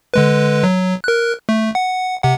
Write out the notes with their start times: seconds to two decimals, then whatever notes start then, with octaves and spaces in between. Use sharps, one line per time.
0.14 D3 G#3 B4
0.64 F#3
1.04 A#4 F#6
1.49 A3
1.75 F#5
2.23 C3 F#5